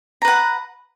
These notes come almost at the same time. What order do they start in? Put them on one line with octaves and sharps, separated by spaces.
A#5 B4 F#5